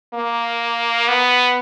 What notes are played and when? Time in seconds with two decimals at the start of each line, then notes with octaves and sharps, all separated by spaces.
0.14 A#3
1.08 B3